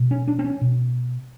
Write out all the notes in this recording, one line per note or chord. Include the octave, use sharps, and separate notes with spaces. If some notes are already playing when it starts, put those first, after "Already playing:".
Already playing: B2
C#4
D4
C4
C#4
B2